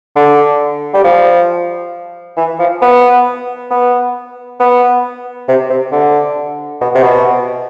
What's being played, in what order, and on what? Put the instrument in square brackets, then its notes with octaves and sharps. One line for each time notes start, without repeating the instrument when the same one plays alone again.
[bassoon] D3
G3
F3
E3
F3
B3
B3
B3
C3
C3
D3
B2
C3
B2